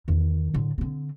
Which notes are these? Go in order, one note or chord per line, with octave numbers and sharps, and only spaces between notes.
E2 D#3
A2 D3
D3 C4